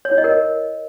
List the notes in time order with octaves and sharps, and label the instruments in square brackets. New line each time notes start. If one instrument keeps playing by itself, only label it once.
[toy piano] C#5
E4
D#5
A#4